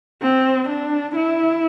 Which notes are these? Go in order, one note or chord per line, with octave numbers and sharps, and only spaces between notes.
C4
D4
E4